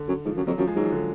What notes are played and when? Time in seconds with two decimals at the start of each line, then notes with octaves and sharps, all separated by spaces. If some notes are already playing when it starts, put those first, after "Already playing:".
Already playing: D3
0.08 F#2
0.25 G#2 F3
0.37 F#2 F3
0.47 F2 F#3
0.58 F#2 F3
0.67 G#3
0.76 G#2 F#3
0.84 F3
0.92 D3